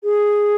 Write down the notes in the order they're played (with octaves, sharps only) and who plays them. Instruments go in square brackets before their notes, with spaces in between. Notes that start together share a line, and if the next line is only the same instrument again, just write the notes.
[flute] G#4